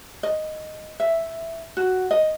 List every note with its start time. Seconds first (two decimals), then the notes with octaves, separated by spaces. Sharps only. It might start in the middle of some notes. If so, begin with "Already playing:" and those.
0.23 D#5
1.00 E5
1.77 F#4
2.11 D#5